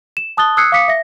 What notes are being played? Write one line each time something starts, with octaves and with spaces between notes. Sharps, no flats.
E7
A5 D#6 F#6 A6 G7
D#6 E6 F#6 G#6 C7 C#7
F5 D6 D#6 B6 C#7
E5 A#6